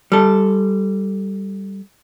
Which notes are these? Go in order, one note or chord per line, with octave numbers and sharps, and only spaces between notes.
G3 A4